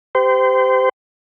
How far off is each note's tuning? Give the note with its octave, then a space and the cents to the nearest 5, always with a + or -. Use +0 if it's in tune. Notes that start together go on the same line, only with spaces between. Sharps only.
G4 +0 C5 -30